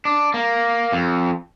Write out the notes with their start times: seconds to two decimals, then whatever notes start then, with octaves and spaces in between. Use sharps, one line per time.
0.05 D4
0.34 A#3
0.92 F2